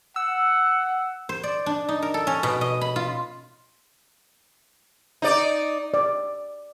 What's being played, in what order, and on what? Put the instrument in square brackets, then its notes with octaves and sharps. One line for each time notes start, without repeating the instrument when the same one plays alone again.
[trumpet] F#5 [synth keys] E6
[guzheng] C5
D5
D4
D#4
A#4
A4
C#4
B2
D#5
B5
F4
[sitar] D#4 D5
[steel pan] D5